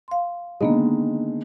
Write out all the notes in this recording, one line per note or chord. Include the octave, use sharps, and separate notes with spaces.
F5 C6
D3 D#3 G#3 A#3 B3 D#5